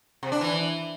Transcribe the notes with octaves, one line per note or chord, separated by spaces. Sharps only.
C3
D4
E3